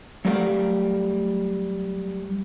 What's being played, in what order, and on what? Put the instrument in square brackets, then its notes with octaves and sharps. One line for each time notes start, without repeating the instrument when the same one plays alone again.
[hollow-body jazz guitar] F#3 G3 A3 A#4 D5 F5